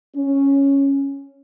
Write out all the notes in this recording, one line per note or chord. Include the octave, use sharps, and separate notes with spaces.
C#4